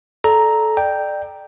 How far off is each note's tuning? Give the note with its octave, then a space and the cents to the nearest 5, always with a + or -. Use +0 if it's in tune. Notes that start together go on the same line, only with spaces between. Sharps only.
A4 -20 D5 +0 A#5 +0
D5 +25 G5 +0